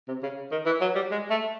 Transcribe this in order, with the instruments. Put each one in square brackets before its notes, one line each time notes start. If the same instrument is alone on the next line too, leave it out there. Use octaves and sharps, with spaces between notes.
[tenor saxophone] C3
C#3
D#3
E3
F#3
G3
G#3
A3